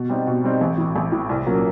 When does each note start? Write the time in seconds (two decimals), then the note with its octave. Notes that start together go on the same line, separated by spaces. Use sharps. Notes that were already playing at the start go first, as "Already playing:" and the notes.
Already playing: B2
0.09 G3 C4 D#4
0.27 B2
0.44 G3 C4 D#4
0.61 A1
0.78 A2 E3
0.96 A1
1.12 A2 E3
1.29 C2
1.46 A#2 F#3 A#3 C#4